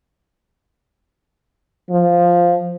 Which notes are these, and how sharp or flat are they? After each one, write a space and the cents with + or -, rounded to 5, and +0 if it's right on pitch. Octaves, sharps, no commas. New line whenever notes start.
F3 +0